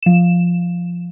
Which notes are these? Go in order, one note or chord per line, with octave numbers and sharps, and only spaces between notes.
F3 E7